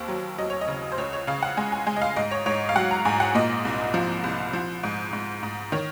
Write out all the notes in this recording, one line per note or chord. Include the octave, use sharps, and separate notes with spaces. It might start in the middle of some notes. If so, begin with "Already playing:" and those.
Already playing: D#2 C4
F#3
F#3 D#5
C#5
D#5
C#3
C5
C#2 C#5
C#5
C#3 F5
F#5
G#3 G#5
G#5
G#3 G#5
D#5
F5
G#2 D#5
C#5
G#2 C#5
F5
F#3 F#5
A#5
G#2 G#5
F#5
A#2 D#5
C2
F3
C2
F3
G#2
G#2
G#2
D#3 C#5